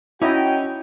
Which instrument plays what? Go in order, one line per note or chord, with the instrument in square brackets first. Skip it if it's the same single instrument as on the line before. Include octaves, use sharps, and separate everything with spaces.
[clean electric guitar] C#4 [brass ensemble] D#4 F#4 G5 [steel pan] E4 D#5